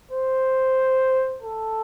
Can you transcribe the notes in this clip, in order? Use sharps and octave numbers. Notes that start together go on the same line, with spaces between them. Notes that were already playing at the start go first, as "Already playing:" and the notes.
C5
A4